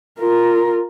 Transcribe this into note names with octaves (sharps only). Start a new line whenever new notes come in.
F4 A#4